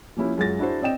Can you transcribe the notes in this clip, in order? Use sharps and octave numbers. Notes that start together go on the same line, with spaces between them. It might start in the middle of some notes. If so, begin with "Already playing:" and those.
F3 A#3 C#4 E4 G4
F#2 G#3 F4 A6 A#6
D4 E4 F#4 G#4 C5
C4 D5 D#5 G5 E7